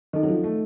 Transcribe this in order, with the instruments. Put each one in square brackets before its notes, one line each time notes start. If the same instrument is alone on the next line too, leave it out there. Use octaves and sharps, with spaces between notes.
[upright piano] D#3 [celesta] D#4 A4 D#5
[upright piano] F#3
F3
A3